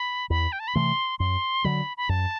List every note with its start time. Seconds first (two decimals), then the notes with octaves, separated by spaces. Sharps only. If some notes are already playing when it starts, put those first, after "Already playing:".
Already playing: B5
0.30 E2 B5
0.52 G5
0.60 A5
0.68 B5
0.75 C3 E3 A3 C6
1.19 F#2 C6
1.64 D3 F#3 B5
1.97 B5
2.09 F#2 A5